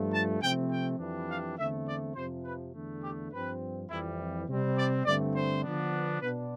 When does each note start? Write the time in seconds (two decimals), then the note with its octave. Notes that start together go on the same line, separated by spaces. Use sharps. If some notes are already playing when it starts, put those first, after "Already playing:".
Already playing: G2 F3 A3
0.13 A5
0.41 C3 F3 A3 C4 G5
0.70 G5
0.99 F2 E3 G3 D4
1.28 F5
1.57 E2 D3 A3 C4 E5
1.87 D5
2.15 F2 C3 F3 C5
2.44 B4
2.73 E2 D3 A3
3.02 G4
3.32 G2 F3 C4 B4
3.88 F2 E3 G3 E4
4.47 C3 G3 C4
4.76 D5
5.05 G2 D3 A3 C4 D5
5.34 C5
5.63 D3 F3 B3 D4
6.20 B2 B3 D4 B4